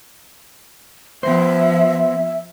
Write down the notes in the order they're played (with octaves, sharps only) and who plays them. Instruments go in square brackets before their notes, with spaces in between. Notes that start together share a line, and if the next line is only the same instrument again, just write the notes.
[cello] F3 [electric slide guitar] B3 C5 [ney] E5